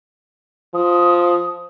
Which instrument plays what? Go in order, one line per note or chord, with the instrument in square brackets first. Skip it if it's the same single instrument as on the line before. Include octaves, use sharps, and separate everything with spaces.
[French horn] F3 [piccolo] D#6